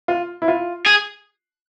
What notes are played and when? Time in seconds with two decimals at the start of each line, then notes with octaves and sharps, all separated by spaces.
0.08 F4
0.42 E4
0.48 F4
0.87 G#4